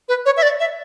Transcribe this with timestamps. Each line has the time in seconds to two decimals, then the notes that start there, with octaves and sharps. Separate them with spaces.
0.09 B4
0.26 C#5
0.37 E5
0.43 D5
0.60 E5